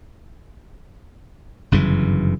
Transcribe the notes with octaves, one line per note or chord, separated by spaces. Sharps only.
G1 F#2 C#3 E3